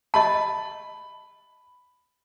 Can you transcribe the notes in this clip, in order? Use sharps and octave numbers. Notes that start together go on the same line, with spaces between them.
D#5 A5 B5